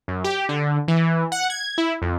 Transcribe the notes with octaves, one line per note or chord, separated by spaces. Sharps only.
F#2
G4
D3
E3
F#5
G#6
E4
F2